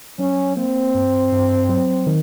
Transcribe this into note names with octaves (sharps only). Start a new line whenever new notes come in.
F#3 C#4
A#3 C4
G2
G2
F#3
D#3